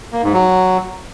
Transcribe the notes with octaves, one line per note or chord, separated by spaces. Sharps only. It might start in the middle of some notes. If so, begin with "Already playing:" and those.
A#3
G#2
F#3